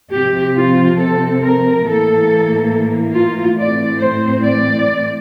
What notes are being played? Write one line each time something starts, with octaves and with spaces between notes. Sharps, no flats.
C3 F3 C4 G4
F4
A4
A#4
A2 E3 A#3 A4
F4
A2 E3 A3 C4 D5
C5
D5